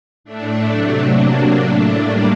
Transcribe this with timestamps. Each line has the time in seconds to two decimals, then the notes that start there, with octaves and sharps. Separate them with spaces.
0.24 A2 A3 D4
0.69 C3 F#3 A3
1.12 C3 F#3 A#3
1.56 A2 A3 D4
2.00 A2 G3 A#3